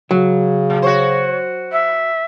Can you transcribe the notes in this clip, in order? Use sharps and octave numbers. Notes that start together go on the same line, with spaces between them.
C#3 F#3
A#2
F#4 C5 C#5
E5